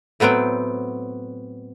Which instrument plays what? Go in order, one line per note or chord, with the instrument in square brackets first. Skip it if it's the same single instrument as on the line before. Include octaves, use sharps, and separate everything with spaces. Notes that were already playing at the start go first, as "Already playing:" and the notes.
[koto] A2 F#3 B3 C4 G5